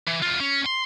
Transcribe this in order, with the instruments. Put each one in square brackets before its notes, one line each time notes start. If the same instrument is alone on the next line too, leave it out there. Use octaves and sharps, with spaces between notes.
[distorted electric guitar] E3
E2 F4
C#4
C6